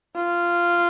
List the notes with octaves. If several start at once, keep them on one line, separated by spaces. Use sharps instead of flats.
F4